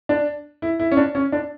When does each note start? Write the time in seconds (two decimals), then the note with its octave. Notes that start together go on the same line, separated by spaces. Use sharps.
0.09 D4
0.62 E4
0.80 E4
0.92 C#4
0.97 D4
1.15 C#4
1.32 D4